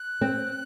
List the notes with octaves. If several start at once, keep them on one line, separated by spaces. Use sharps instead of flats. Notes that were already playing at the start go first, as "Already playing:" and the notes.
Already playing: F#6
C4